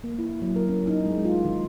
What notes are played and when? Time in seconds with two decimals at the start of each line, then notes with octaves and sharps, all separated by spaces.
0.04 A#3
0.19 E4
0.42 F#3
0.56 A#4
0.69 C#4
0.87 D#4
1.06 G#3
1.25 F4
1.45 D#3